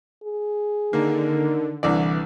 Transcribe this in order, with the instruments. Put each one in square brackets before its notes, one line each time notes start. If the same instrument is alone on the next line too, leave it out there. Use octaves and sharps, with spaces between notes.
[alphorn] G#4
[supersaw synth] D3 [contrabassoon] D#3 [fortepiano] A#3
[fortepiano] C2 D3 D5 [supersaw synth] E3